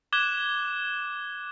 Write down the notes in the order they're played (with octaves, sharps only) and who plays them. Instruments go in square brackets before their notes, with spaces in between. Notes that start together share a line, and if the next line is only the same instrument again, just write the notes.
[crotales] D6 F#6 G#6 E7 G7